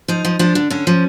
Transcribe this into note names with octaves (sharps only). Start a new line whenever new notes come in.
F3 D#4
F3
F3 D4
D3
D3 C#4
F3